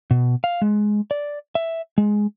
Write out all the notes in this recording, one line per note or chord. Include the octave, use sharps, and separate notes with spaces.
B2
F5
G#3
D5
E5
G#3